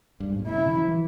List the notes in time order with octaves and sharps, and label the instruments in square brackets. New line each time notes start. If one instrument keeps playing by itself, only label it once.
[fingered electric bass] G2
G#2
A#2
[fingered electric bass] C3 [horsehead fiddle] E4
[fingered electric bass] C#3
E3
F3
E3